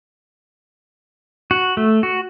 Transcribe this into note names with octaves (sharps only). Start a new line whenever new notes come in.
F#4
A3
F#4